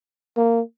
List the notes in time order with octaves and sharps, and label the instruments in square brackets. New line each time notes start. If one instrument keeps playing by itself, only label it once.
[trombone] A#3